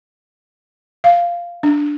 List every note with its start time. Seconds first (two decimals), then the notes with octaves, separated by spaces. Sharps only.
1.04 F5
1.63 D4